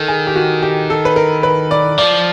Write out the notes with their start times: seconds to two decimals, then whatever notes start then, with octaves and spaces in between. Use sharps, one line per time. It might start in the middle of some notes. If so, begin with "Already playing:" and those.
Already playing: D#3 A4
0.08 G#4
0.27 G4
0.36 F#4
0.63 G4
0.90 A4
1.05 B4
1.16 A#4
1.43 B4
1.71 D5
1.98 F3 D5